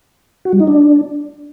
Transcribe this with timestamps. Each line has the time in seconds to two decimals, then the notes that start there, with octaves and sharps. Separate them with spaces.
0.45 F#4
0.53 G3
0.60 D#4
0.68 D4